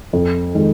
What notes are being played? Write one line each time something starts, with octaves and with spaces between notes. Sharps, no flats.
F2
D#3 G#3